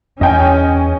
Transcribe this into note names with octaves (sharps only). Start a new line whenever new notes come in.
E2 C#4 D#5 G5 G#5